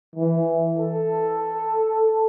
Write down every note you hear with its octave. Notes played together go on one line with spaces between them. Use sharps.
E3
A4